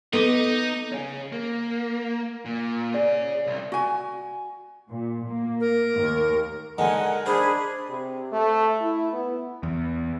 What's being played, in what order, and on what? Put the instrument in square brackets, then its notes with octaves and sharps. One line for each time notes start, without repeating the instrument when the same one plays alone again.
[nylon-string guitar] B3 [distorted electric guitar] D#4 [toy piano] A4 D6
[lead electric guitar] C#4 G#4
A#3
A#2
[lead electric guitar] C#4 G#4 [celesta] D5
[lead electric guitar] C2
[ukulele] F#4 G#5
[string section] A#2
A#3
[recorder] A#4
[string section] D#2
[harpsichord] D3 D#3 G#3 [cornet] A#4 [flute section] F#5 G#5
[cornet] D4 [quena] G#4 [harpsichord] C5 [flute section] B5
[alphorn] C3
A3
E4
B3
[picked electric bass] E2